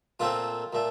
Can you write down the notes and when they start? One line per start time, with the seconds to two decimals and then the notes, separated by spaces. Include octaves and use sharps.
0.20 A#2 A3 C4 F4
0.73 A#2 A3